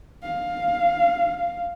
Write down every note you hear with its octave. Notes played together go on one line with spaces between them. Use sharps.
F5